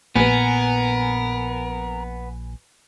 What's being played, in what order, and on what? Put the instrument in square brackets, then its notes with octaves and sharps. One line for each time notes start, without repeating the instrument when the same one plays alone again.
[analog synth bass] A#1 [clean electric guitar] B3 [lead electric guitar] A#4 [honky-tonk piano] B4 G#5